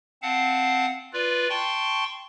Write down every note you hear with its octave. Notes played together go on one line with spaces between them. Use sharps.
C4 F5 F#5 A5
F4 B4 D5
G5 A5 C6 C#6